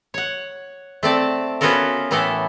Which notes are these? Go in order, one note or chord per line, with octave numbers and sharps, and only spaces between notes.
C#5 F#5
A3 C4 D5 A5
B3 C#4 F4 F#4 A4 A#4
A2 E3 A3 B3 A4 A#4